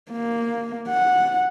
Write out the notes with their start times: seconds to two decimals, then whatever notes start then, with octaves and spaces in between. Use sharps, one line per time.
0.11 A#3
0.89 F#5